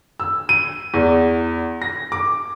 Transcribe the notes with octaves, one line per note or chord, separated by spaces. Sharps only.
E6
D#7
E2
A#6
D6